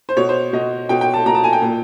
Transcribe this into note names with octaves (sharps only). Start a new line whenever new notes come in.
C5
B2 C#5
C5
B2 D#5
B2 G5
G5
A5
B2 A#5
A5
G#5
G5
A#2